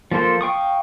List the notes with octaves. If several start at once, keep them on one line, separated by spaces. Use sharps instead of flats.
F3 A#3 A4 C5
F5 G5 C#6 D#6